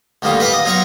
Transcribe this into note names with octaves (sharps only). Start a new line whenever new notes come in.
D2 D#3 G3 A#3 D#4 F4
B4 F5 F#5 B5 D6
D#5
F#3 D#4 F4 A#4 F5 C#6